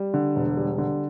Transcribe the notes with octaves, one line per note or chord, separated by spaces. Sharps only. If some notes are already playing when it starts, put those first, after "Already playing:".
Already playing: G3
D3
E1
G3
D3